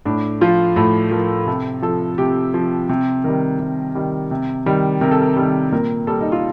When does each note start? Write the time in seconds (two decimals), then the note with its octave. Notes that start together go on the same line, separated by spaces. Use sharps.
0.06 A2 D4
0.41 F3 F4
0.76 A2 A4
1.11 F3 A#4
1.47 C3 A4
1.82 F3 A4
2.18 C3 G4
2.54 F3
2.89 C3
3.24 D#3 G3 A#4
3.60 C3
3.95 D#3 G3
4.31 C3
4.66 D#3 G3
5.01 C3 A#4
5.11 A4
5.21 A#4
5.37 D#3 G3 A4
5.72 A#2 A#4
6.07 G3 A4
6.21 D#4
6.32 F4